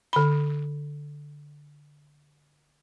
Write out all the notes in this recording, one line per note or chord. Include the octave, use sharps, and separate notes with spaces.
D3 B5